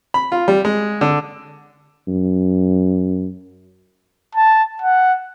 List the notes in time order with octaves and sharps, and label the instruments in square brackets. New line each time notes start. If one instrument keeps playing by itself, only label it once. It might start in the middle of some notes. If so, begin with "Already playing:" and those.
[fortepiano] B5
F4
G3
G#3
D3
[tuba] F#2
[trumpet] A5
F#5